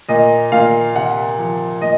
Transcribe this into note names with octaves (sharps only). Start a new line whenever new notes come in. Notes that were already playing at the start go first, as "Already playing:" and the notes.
A#2 D#5
A#2 F5
C3 F#5
F3
A#2 D#5